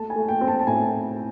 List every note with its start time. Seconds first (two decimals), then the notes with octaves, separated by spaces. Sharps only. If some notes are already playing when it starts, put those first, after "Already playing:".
Already playing: A3 A5
0.10 G#5
0.16 A3
0.28 G5
0.41 C4
0.48 A5
0.59 A5
0.67 A2 G#5